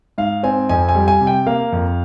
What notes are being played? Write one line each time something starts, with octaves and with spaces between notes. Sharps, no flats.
G#2 F5
C4 G#5
F2 G#5
G#5
G3
G#5
C3
G5
A#3 F5
F2